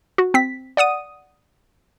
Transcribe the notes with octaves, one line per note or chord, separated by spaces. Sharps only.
F#4
C4 B6
D5 F#5 D#6 D#7